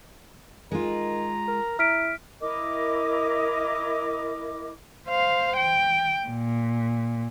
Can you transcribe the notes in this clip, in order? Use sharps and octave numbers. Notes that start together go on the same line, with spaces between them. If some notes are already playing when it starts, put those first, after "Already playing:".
D#3 G#3 F4 A#5
A#4
E4 F6 B6 D7
E4 A#4 D#5 D6
C5 F5
G5
A#2